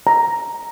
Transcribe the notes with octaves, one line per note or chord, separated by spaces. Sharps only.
A#5